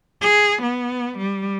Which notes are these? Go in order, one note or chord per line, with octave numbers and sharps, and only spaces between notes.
G#4
B3
G3